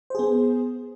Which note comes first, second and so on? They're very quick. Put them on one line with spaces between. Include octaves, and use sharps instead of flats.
C5 G#4 B3